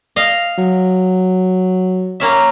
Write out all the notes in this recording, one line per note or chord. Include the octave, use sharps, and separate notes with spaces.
D#5 F5
F#3
A#3 C#4 E5